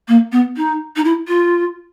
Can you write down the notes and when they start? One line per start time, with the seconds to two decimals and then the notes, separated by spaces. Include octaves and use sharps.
0.08 A#3
0.32 B3
0.57 D#4
0.96 D#4
1.04 E4
1.28 F4